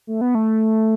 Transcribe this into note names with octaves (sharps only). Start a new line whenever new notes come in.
A3
B3
A3